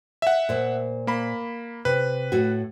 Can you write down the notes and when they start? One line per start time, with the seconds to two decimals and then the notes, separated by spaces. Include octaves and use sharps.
0.22 E5 F#5
0.49 A#2 C5
1.07 A#3 B5
1.85 C3 B4
2.32 A2 F#4